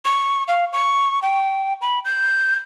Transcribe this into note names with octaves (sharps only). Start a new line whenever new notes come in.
C#6
F5
C#6
G5
B5
G6